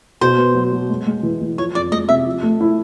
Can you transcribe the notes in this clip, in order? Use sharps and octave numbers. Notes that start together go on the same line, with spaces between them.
B2 C5
B3
F#3
F#3
G#3
G#3
E3
E3
F3 C#5
F2 D5
G#3 D#5
C3 E5
F3
A3
E4